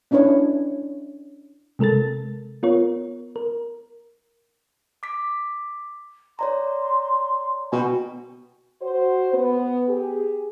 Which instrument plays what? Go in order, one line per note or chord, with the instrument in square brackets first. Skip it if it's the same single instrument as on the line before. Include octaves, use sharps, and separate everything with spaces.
[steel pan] C#4 D4 E4 B4 C#5
[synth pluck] C3 G#3 A4 A#4 A6
B3 F4 A#4 C#5
A#4
[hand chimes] D6 B6
[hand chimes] C#5 D5 A#5 [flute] C6
[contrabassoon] B2 [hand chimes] G5 G#5
[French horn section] F#4 C5
B3
G4 G#4